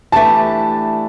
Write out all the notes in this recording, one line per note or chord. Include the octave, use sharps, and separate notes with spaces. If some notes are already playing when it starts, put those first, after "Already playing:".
E3 A3 D4 G4 A5